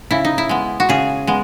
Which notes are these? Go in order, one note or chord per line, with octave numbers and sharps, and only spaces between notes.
C#3 E4
D#4
E4
G#3 B3
F#4
C#3 G#4
G#3 B3